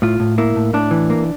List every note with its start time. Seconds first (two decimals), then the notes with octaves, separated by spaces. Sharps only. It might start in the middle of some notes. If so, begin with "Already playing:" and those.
0.02 A2 F4
0.20 A2
0.38 A#3 E4
0.56 A2
0.73 A2 D4
0.91 E3
1.10 A#3